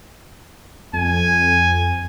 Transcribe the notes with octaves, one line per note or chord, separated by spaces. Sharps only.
F2 G#5